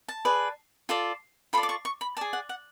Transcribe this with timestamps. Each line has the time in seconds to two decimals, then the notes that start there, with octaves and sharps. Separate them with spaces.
0.08 A5
0.25 G#4 B4 D5
0.89 F4 A4 D5
1.53 F4 A4 D5 B5
1.63 D6
1.69 C#6
1.85 C#6
2.01 B5
2.17 G#4 D5 A5
2.33 F#5
2.49 F#5